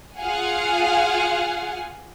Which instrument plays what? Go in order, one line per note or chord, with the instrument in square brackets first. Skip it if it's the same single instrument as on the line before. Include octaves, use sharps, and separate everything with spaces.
[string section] F4 G#4 F5 F#5 G#5